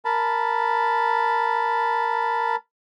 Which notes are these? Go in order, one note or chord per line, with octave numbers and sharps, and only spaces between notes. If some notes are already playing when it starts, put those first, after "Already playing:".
A#4 A5 B5